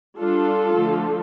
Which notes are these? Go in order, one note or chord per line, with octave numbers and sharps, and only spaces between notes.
G3 D4 F4 A4
D3 F3 A3